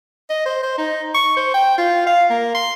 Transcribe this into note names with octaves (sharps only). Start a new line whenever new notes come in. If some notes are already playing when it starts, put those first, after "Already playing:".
D#5
C5
C5
D#4
C#6
C5
G5
F4
F5
A#3
C6